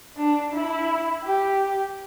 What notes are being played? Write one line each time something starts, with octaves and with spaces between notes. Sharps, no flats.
D4
E4
G4